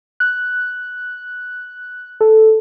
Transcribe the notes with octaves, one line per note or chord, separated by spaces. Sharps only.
F#6
A4